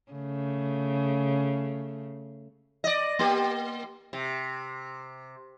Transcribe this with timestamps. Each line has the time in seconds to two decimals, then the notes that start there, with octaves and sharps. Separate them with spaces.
0.12 C#3 A3
2.84 D5 D#5
3.19 A#3 G4
4.13 C3